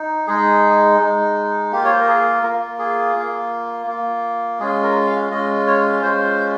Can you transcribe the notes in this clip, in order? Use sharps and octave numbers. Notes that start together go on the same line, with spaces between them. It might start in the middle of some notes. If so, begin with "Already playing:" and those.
Already playing: D#4
G#3 D#4 G#4
G#3 D#4
A#3 F4 G4
C#5
C5
A#4
G#4
A#3 F4 A#4
G#4
A#3 F4
A#3 F4
G#3 C#4 F4 G#4
A#4
F5
G#3 C#4 F4 D#5
C#5
G#3 C#4 F4 C5